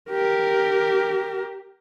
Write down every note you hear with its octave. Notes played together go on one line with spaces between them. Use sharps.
G4 A#4